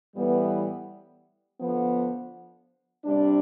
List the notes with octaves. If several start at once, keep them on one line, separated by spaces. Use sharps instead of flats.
A2 E3 G3 B3 E4
D3 F3 B3
C3 G3 D4